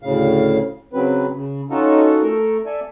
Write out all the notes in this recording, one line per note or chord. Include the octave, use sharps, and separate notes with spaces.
D2 A2 C#3 F5
C#3 F#3 C4 B4
C#3
C#4 D#4 F4 F#4 A4
A3 A4 A#4
A4 D5 E5 G#5